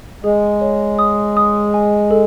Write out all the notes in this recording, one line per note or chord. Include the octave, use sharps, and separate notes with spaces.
G#3 G#4
C#5
D#6
D#6
G#5
A4